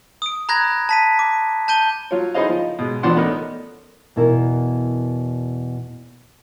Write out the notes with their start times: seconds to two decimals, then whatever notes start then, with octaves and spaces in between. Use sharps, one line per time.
0.22 D#6 D7
0.49 A#5 B5 F#6 G#6 A#6
0.89 A5 B6 D#7
1.19 D6
1.68 A5 G6 D#7 G7
2.11 F#3 F4 C#5
2.34 D#4 E4 G#4 C5 D#5 F5
2.49 F3
2.79 B2 G#3
3.03 A1 F3 B3 D4 F#5 C6
3.16 A3 B3 C#4 D#4 A#4
4.16 E2 B2 E4 A#4